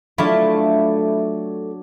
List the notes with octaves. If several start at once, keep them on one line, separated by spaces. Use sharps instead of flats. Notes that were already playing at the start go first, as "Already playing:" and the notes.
F#3 A3 D4 E4 F4